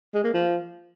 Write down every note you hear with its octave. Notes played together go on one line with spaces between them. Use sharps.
G#3
A#3
F3